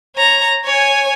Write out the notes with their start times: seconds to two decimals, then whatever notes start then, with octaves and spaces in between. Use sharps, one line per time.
0.16 C#5 A#5
0.64 C#5 G#5